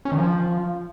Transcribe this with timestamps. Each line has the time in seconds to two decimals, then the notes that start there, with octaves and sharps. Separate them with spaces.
0.05 C#4
0.12 D#3
0.18 F3